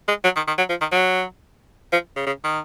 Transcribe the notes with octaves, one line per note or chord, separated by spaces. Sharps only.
G#3
F#3
D#3
D#3
F#3
F3
D#3
F#3
F3
C#3
C#3
D#3